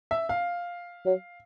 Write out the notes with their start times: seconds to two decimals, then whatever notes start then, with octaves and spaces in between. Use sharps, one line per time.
0.11 E5
0.29 F5
1.05 F#3